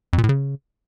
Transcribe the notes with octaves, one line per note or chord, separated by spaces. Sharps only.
F2
A#2
A2
C#3